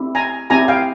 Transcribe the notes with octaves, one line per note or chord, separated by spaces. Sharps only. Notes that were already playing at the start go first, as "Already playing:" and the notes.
Already playing: C4 E4 G4
G#5 A#5
C4 E4 G4 G#5 A#5
F5 G5